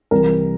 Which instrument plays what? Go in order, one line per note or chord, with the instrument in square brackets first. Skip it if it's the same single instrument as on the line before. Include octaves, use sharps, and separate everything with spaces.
[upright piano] C2 C3 E3 G3 A#4